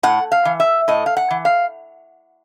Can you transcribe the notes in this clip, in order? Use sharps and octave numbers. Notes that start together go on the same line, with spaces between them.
A2 F#5
F5
E3
E5
A2 D#5
F5
F#5
E3
F5